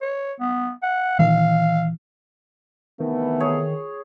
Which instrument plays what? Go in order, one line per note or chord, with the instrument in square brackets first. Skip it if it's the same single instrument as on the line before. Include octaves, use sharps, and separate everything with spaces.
[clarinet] C#5
B3
F#5
[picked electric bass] A#2 D#3 E3 [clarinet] F5
[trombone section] C3 E3 A3 [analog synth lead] D#3 [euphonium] B3
[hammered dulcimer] G#4 C#5